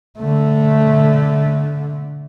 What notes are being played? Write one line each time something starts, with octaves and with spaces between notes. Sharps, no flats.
D3 A3